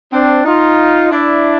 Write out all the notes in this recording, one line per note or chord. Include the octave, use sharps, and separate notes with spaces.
C4 D4
D#4 F4
D4 E4